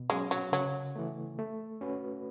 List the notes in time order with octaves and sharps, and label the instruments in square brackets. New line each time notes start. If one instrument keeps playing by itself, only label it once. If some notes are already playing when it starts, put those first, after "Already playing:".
Already playing: [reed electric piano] B2
[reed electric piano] F#3 C#4 [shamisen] G#3
[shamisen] F#3
[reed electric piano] C#3 [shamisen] F#3
[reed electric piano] E3 A3
A3
C#4 F#4 B4